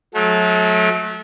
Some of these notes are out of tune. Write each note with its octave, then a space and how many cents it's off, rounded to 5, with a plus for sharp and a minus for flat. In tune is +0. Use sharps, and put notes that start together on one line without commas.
F#3 -30 A3 -35